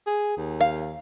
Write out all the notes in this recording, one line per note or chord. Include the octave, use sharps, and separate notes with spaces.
G#4
D#2
F5